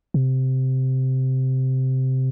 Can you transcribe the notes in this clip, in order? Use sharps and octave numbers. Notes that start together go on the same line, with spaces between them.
C3